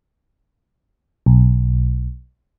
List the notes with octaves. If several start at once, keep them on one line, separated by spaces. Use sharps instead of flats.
B1